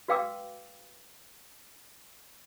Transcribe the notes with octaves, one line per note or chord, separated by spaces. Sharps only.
F#4 B4 F5 G5 D6 E6